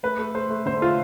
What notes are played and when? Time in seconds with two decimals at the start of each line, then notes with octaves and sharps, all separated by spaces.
0.03 A3 B4
0.19 A3
0.35 A3 C5
0.50 A3
0.66 D3 C5
0.81 A3 F4